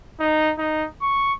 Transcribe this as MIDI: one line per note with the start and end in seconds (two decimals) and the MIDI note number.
0.20 0.52 63
0.58 0.85 63
1.02 1.33 85